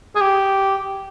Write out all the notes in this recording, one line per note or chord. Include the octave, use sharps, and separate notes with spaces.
G#4
G4